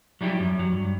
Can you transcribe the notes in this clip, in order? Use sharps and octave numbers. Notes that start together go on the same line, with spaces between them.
F#3 G3 E4 G4
F#2
F#3
G2